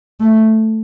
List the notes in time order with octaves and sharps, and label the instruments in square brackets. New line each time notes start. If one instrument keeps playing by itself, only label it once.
[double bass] A3